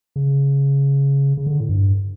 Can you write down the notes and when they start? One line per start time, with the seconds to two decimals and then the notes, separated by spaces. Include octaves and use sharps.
0.16 C#3
1.37 C#3
1.47 D3
1.60 A2
1.69 G2